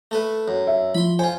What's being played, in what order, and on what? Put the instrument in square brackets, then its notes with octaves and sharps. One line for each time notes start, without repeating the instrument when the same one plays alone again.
[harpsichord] A3 A4 B4
F#2
[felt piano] E5
[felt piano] F3 [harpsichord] B5 C6
[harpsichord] F4 C5 [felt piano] G#5